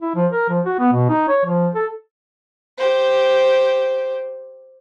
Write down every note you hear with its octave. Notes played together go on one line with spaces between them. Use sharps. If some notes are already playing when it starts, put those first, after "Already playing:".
E4
F3
A#4
F3
F#4
B3
B2
D#4
C#5
F3
A4
G4 C5